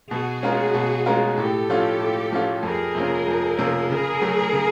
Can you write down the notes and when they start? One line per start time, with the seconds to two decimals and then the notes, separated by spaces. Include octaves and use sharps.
0.11 B2 F#4 G#4
0.43 G#3 C#4 F4 A#4
0.74 B2
1.06 G#3 C#4 F4 A#4
1.37 A2 G4 A4
1.69 F3 A3 C#4 F4
2.00 A2
2.32 F3 A3 C#4 F4
2.63 F2 G#4 A#4
2.95 C3 F3 A#3 C#4
3.27 F2
3.57 C3 F3 A#3 C#4
3.89 C#3 G#4 A#4
4.21 F#3 A3
4.52 C#3